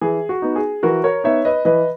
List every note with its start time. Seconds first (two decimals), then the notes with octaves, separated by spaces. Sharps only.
0.01 E3 G#4
0.29 F#4
0.42 B3 D#4
0.56 G#4
0.83 E3 F#4 A#4
1.04 A#4 C#5
1.24 B3 D#4 C#5 E5
1.45 B4 D#5
1.65 E3 B4 D#5